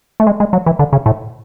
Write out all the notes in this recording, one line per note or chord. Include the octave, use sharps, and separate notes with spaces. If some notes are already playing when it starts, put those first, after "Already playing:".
A3
G#3
G#3
F#3
E3
D3
C#3
A2